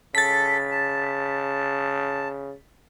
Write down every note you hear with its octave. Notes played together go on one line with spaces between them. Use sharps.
C#3 A4 A6 B6
A5